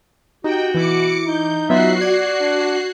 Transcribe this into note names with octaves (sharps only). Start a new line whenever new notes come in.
D#4 F#4 G4 G5
B2 E3 E4 D6 C#7
D#4 G6
F#3 B3 F4 F#4 E5 F#6 C7
D5 G#6
D4